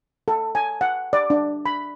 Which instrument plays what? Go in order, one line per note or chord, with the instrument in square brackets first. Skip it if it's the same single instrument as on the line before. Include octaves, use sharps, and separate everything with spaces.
[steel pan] A4
G#5
F#5
D5
D4
B5